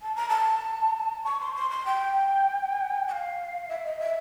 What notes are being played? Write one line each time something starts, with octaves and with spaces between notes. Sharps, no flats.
A5
A#5
A5
C#6
C6
C6
C6
G5
G5
F5
E5
D#5
E5